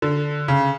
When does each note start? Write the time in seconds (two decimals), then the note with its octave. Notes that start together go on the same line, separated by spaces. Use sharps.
0.02 D3
0.48 C#3